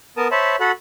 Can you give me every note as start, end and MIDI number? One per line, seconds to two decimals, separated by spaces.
0.17 0.28 59
0.17 0.28 70
0.17 0.28 81
0.17 0.28 87
0.31 0.56 72
0.31 0.56 73
0.31 0.56 76
0.31 0.56 81
0.31 0.56 83
0.60 0.72 66
0.60 0.72 69
0.60 0.72 78
0.60 0.72 83